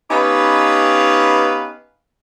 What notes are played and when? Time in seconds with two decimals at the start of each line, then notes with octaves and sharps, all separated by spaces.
0.10 B3 C#4 D#4 G4 B4 F5